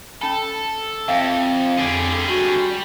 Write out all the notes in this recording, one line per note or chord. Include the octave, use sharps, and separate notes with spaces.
C#4 A4 A5 B5
F2 E5 F5 G5
F2 D3 G3 G#4
F#4 C#6